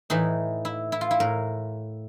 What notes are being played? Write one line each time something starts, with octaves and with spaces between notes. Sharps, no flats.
A2 E3 D#4
E4
E4
F4
E4
A2 A#4